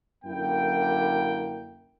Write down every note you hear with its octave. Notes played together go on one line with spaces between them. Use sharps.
F#2 D3 A#3 E4 G5